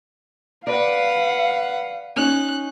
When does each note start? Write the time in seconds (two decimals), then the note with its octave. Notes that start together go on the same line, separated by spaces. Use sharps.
0.67 B4 D5 F5 F#5
2.16 C#4 D#4 F#6